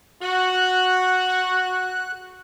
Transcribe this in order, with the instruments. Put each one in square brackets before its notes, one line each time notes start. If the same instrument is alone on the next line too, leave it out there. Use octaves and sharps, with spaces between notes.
[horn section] F#4 [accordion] F#6